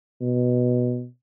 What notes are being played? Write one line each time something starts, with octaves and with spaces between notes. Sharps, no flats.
B2